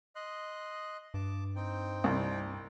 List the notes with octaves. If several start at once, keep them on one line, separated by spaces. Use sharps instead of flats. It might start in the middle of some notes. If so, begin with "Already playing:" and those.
D#5 C6 F#6
G2 A5 D6
C4 D#4 G5
C2